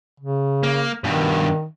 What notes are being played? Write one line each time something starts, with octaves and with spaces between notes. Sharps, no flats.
C#3
A#3
G2 B2 D#3